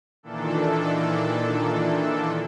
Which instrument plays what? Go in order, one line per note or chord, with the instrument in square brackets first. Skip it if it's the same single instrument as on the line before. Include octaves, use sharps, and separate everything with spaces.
[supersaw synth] A#2 D#3 E3 D4 A4